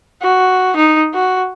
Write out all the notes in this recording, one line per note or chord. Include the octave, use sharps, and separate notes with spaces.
F#4
D#4
F#4